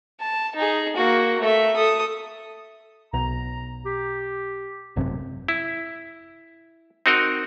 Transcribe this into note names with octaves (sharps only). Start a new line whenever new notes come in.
A5
D#4 G#4
A#3 F#4
A3 E5
A4 D#6
B1 A#5
G4
G#1 F#2 C3
E4
C4 D#4 F#4 A#4 D#5